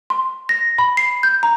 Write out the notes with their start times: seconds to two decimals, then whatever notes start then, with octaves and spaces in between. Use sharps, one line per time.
0.10 C6
0.49 A#6
0.78 B5
0.97 C7
1.23 G6
1.43 A#5